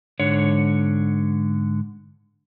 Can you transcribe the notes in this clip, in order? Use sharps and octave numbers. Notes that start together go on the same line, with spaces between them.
G#2 D3 C#5